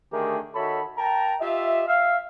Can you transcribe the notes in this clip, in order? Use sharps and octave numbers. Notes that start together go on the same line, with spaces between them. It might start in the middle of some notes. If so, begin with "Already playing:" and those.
D3 D#3 A3 G4 G#4 A#4
D#3 F#4 A4 C#5 E5 B5
A#4 G5 A5 A#5
F4 G4 D#5 E5
E5 F5